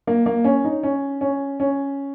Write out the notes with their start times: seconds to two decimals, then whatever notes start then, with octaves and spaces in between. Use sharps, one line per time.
0.07 A#3
0.26 A#3
0.44 C#4
0.65 D#4
0.83 C#4
1.21 C#4
1.60 C#4